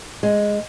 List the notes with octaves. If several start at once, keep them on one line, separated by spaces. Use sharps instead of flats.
G#3